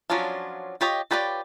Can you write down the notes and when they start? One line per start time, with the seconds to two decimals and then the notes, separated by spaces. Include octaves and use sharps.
0.10 F3 F#3 C#4 D4 F4
0.81 F4 G4 C#5 D#5
1.11 F4 G4 B4 C#5 D5